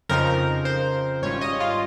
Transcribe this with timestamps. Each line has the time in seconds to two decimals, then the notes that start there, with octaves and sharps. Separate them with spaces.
0.09 F2 C#3 F3 C4 D#4 A#4
0.65 C5
1.22 G#1 G#2 G3 C#4 F4 C#5
1.41 D#5
1.60 F4